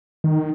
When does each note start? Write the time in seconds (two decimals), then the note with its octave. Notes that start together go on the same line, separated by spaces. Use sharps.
0.24 D#3